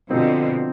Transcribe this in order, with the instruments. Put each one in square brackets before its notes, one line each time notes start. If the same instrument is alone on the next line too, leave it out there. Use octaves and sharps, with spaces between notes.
[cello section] B2 D3 [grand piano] F3 C4 D#4